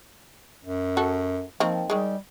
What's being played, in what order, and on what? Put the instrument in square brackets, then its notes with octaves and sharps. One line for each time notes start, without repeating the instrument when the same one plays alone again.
[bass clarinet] F#2
[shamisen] F#4 A4
[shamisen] D#3 A#3 C4 [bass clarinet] F3
[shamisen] D#3 G#3 [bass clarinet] G3